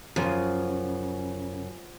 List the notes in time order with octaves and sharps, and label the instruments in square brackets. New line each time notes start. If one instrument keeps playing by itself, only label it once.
[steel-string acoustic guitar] F#2 [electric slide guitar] C#3 [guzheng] F3